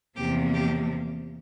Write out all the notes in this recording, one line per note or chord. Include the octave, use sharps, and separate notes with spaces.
E2 C3 F3 A#3 G4
G4